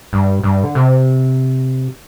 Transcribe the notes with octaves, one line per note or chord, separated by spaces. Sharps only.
G2
G2
D3
C3